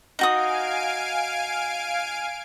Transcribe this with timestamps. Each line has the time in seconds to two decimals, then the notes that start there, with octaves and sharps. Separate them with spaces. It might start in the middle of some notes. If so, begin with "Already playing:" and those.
0.19 D#4 F#4 F5 G#5 D#6 D7